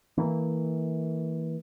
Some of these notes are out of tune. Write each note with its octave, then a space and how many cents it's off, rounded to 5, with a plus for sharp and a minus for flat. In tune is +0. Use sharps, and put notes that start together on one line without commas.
E3 -25 A#3 -20